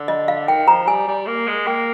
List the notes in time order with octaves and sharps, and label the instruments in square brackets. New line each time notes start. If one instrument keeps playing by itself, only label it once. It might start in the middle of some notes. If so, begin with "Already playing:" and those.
Already playing: [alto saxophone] D3
[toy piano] D#5
F5
[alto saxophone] D#3 [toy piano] G5
[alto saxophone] F3 [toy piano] A#5
[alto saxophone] G3 [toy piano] G#5
[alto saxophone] G3
A#3
G#3
[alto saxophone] A#3 [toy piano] G5